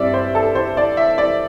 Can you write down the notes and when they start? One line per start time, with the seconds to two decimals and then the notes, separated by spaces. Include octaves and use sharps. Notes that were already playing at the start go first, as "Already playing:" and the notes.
Already playing: G2 G3 C4 D5 E5
0.14 C5
0.35 A4
0.55 C5
0.77 D5
0.97 E5
1.18 D5